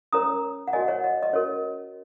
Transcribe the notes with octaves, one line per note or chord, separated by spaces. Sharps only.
C#4 A#4 C#5 A#5 D#6
F#5
F#4 A#4 C#5 D#5 G#5
C#5 F#5
D#5
D#5
C#4 F#4 A#4 C#5